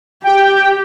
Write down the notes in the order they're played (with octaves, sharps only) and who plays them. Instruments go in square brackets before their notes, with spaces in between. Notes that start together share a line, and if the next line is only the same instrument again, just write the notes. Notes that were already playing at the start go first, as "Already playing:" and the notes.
[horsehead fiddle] G4 [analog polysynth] G5